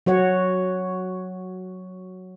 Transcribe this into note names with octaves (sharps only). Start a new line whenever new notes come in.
F#3 F#4 C#5 F#5